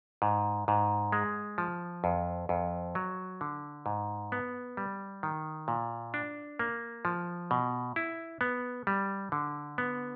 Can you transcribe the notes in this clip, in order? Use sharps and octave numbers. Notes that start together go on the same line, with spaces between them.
G#2
G#2
G#3
F3
F2
F2
F#3
D3
G#2
B3
G3
D#3
A#2
D4
A#3
F3
B2
E4
B3
G3
D3
B3